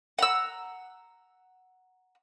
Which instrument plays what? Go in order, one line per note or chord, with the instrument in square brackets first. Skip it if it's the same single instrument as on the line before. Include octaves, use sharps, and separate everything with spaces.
[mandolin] F#5 A#5 E6